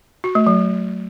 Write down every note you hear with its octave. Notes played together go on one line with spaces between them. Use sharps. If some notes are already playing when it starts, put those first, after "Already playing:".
F#4
A3
F#3